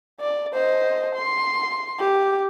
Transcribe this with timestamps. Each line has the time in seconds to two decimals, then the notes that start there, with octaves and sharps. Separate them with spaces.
0.20 D5
0.53 C5 D#5
1.16 C6
1.99 G4